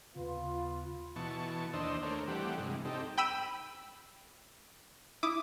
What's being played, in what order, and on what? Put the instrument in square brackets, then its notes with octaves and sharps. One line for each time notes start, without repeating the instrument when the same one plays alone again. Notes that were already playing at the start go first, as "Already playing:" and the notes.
[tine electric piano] D#2 C#3 [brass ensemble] B3 F4
[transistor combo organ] B2 E3 A5 C#6
D#2 D4 C5 D#5 E6
A3 D4 A#4 C5 C#5
E3 G3 A3 C4 G4 F#5
G2 C3 G#3
C4 D#4 G4 A4
[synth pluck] G5 B5 E6 D#7
E4 D6 D#6